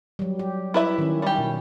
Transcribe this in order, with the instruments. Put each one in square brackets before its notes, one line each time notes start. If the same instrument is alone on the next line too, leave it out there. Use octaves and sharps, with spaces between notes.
[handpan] F#3 G3
G4
[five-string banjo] E4 B4 E5
[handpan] D#3 C#4
[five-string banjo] G3 G4
[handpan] B2 E4